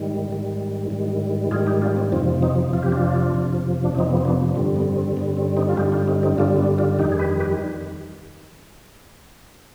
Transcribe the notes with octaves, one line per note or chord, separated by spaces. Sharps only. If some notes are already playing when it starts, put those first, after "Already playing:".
Already playing: G#2 D#3 G3
G#2 D#3 G3
G#2 D#3 G3
G#2 D#3 G3 F4 G#4
D#4 G4
D4 F4
C4
F2 C3 F3 C4
C4 D#4
F2 C3 F3 F4
G4
D4 F4
F2 C3 F3
D4
F2 C3 F3 C4 D#4
B3
C4
B3 D4
G2 D3 G3 C4
B3
C4
G2 D3 G3 B3
C4
C4 D#4
F4
G2 D3 G3 D#4 G4
D4 F4
C4 D#4
C4 D#4
G2 D3 G3 D4 F4
B3 D4
D4 F4
F2 D#3 G3 D#4 G4
G#4
G4 B4
G4 B4